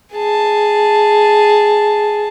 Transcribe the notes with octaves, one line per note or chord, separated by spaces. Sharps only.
G#4 A5